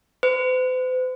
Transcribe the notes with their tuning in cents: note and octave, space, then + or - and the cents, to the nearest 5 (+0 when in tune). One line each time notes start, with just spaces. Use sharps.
C5 -45